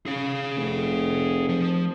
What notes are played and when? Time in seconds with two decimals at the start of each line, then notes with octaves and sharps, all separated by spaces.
0.06 C#3 G#4 F5
0.57 F1
1.49 F3